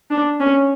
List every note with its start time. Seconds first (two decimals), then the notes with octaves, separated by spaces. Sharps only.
0.11 D4
0.40 C#4